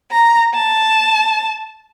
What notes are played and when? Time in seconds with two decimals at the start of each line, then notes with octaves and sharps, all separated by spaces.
0.11 A#5
0.54 A5